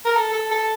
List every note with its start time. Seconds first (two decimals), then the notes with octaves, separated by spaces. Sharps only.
0.05 A#4
0.16 A4
0.33 A4
0.51 A4